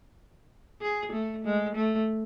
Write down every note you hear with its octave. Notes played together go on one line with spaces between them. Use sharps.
G#4
A3
G#3
A3